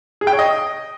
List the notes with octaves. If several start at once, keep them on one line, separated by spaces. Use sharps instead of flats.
G#4
G5
C#5
D#5